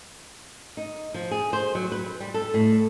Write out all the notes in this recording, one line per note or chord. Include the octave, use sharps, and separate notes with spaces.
D#4
F3
G#4
C5
F#3
B4
G3
A4
A2